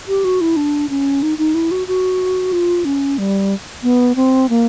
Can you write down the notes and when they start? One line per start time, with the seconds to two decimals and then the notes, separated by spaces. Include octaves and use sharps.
0.08 G4
0.24 F#4
0.41 E4
0.56 D4
0.90 C#4
1.23 D#4
1.38 D#4
1.54 E4
1.71 F#4
1.88 F#4
2.52 F4
2.85 C#4
3.18 G3
3.83 B3
4.16 C4
4.49 A#3